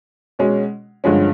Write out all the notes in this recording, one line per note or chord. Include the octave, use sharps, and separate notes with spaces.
B2 G#3 C#4
G2 D3 F3 G#3 C#4